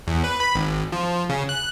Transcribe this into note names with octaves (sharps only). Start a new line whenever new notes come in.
E2
B4
B5
G#1
F3
C#3
F#6